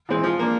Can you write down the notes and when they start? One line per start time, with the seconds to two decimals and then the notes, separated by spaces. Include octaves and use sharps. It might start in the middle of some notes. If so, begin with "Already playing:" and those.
0.09 E3 G#3 C4
0.23 F3
0.39 A#3 D4